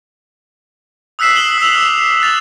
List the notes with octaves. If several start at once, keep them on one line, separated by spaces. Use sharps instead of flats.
D#6 E6 F#6 B6 C7 E7
E7 F#7 G7
E6 C7 F7
D6 E6 F6
F#6 A6 F7